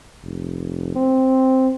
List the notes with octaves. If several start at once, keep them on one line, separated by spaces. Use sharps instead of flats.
F1
C4